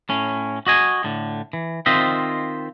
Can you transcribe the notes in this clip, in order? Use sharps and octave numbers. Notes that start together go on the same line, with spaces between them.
A2 C#4
F#4 D#5 G#5
A2 D3
E3
D#3 C4 F4 C5 D#5 E5